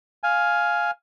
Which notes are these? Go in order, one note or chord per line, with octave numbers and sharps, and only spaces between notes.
F5 G#5